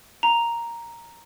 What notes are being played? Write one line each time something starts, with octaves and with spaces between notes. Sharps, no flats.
A#5